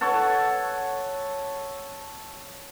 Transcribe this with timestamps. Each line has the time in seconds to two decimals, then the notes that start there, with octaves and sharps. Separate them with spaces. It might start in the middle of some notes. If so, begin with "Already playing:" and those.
0.01 A4 C#5 F#5 A5